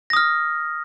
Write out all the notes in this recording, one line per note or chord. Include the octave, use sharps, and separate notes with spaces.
D#6 F6 A#6